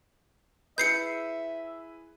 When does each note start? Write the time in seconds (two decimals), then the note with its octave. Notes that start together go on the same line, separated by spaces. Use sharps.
0.78 E4 G#4 B4 E5 G6 C7 C#7